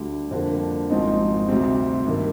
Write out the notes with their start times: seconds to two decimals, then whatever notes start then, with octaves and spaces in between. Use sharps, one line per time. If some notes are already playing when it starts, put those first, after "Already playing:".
Already playing: D2 D3 G3
0.31 F2 D3 G3 A#3
0.90 G#1 G#2 F3 C4 D#4
1.49 D2 C3 G3 C4
2.07 G2 D#3 A#3